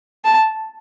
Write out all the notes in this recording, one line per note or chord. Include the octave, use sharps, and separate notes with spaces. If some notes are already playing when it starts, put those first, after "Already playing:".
A5